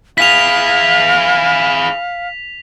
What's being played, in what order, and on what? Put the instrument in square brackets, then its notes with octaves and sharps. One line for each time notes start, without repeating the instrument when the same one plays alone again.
[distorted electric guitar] E4 G#4 [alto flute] F5 [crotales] B6 F7